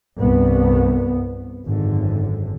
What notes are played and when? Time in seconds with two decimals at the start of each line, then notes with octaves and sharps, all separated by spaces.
0.18 C2 G2 B3
1.67 G#1 F#2 D3